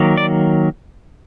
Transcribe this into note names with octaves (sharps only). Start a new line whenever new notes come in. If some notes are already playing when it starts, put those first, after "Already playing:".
Already playing: D#3 F#3 A#3
D5